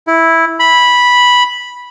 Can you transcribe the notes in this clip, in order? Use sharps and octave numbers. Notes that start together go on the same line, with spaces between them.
E4
B5